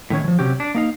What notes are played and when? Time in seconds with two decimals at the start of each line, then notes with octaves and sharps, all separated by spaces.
0.10 A2 D#3 C#4 C#5
0.24 E3 F3
0.39 C3 F#3 C#4 G4
0.60 D4
0.75 A#3 D#4 F5